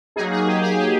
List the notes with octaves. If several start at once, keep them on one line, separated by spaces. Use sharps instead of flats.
F#3 A#3 D#4 G#4
G#4
G4
G#4
G4